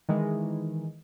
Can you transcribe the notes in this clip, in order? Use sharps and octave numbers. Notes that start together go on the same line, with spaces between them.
D#3 E3 G#3